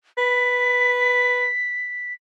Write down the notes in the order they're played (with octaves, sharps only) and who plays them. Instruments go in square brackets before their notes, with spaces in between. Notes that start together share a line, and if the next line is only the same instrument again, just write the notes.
[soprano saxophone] B4 [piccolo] B6